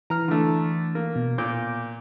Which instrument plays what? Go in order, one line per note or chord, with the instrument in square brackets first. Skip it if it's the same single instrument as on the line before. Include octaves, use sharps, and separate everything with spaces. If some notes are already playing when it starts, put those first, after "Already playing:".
[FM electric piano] E3 [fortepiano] A#5 F6
[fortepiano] D3 A3
A#3
[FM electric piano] B2
[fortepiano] A#2 [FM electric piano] D6 G6